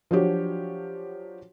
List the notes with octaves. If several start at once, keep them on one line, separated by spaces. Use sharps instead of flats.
F3 F#3 D4 F#4 G4 C#5